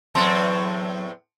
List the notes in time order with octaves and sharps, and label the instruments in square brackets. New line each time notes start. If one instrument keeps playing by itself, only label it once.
[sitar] E2 A2 C4 [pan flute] F#3 [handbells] A5 C6